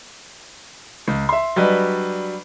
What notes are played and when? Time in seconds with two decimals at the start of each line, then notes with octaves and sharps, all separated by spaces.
1.08 C#2
1.29 E5 C6
1.56 F#3 G3 D4 B4 D#5